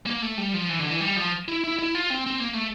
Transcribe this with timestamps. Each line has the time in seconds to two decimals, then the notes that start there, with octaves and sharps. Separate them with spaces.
0.06 A#3
0.22 A3
0.38 G3
0.54 F3
0.69 E3
0.80 D3
0.90 E3
1.00 G3
1.16 F3
1.48 E4
1.64 E4
1.79 E4
1.95 F4
2.10 C4
2.26 C4
2.40 A#3
2.54 A3